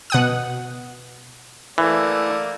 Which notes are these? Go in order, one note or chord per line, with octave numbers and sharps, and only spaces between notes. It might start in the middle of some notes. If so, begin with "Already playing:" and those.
B2 F#5 D#6
E3 A3 A#3 D5